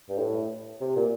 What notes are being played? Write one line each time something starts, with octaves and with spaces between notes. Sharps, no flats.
G2
A2
C3
A#2